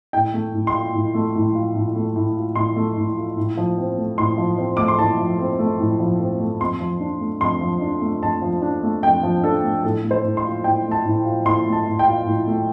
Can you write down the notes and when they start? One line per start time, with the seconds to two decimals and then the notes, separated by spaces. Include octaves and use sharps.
0.13 A2 G5
0.34 A3
0.54 A2
0.67 C6
0.74 F4
0.94 A2
1.14 A3
1.35 A2
1.55 F4
1.75 A2
1.95 A3
2.16 A2
2.36 F4
2.56 A2 C6
2.76 A3
2.97 A2
3.17 F4
3.37 A2
3.57 F3
3.78 C4
3.98 A3
4.18 A2 C6
4.38 F3
4.58 C4
4.77 A3 D6
4.88 C6
4.98 A2 A5
5.19 F3
5.39 C4
5.59 A3
5.79 A2
6.00 F3
6.20 C4
6.40 A3
6.60 F2 C6
6.81 F3
7.01 D4
7.21 A3
7.41 F2 C6
7.61 F3
7.82 D4
8.01 A3
8.22 F2 A5
8.42 F3
8.62 D4
8.83 A3
9.03 F2 G5
9.23 F3
9.43 D4 A4
9.64 A3
9.83 A2 A4
10.04 A3
10.11 C5
10.24 A2
10.37 C6
10.45 F4
10.64 A2 G5
10.85 A3
10.91 A5
11.05 A2
11.25 F4
11.45 A2 C6
11.66 A3
11.73 A5
11.86 A2
11.99 G5
12.06 F4
12.26 A2
12.47 A3